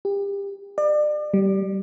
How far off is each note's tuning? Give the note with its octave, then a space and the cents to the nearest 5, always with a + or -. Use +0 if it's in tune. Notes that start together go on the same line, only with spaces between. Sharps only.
G4 +30
D5 +35
G3 -15